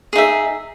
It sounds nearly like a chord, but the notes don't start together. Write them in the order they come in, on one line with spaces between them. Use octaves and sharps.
G#4 D#4 E5